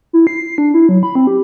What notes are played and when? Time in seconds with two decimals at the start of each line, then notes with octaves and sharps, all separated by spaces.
0.13 E4
0.27 C7
0.58 D4
0.74 E4
0.89 F#3
1.03 B5
1.15 C4
1.27 G4